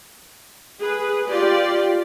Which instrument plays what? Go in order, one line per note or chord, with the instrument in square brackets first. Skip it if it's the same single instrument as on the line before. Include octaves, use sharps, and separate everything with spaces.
[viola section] G#4 B4
F4 G4 D5